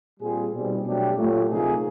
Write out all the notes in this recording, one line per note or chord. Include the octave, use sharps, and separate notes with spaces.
A#2 G3 C4 F4 G#4
B2 G3 C4 D#4
B2 F#3 A3 D4 G4
A#2 F#3 A3
C3 F3 A#3 D#4 G#4